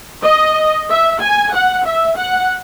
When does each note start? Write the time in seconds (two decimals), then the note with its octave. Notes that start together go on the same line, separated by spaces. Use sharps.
0.25 D#5
0.90 E5
1.21 G#5
1.53 F#5
1.85 E5
2.17 F#5